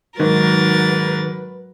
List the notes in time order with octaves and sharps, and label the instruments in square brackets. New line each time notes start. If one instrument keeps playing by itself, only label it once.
[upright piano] G#2 [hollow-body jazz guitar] D#3 [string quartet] F#3 A#4 A6 [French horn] B4